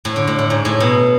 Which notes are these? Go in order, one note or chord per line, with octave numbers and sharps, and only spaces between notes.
A2
D3
A2
A2
G#2
A2
B2